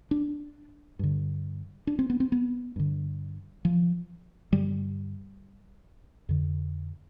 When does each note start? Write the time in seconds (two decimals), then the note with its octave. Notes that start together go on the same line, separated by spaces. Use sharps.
0.11 D4
0.99 G2 D3
1.87 D4
1.99 C4
2.10 B3
2.20 C4
2.32 B3
2.76 G2 D3
3.65 F3
4.52 G2 D3 G3
6.29 F2 D3